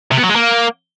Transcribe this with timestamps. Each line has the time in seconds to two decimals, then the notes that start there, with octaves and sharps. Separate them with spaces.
0.11 C3
0.17 B3
0.23 F#3
0.29 G#3
0.35 A#3